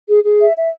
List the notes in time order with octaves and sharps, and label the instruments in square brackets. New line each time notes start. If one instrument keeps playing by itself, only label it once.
[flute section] G#4
G#4
E5
E5